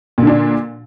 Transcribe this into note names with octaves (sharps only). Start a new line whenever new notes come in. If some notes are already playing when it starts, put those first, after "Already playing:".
A#2 D3 D4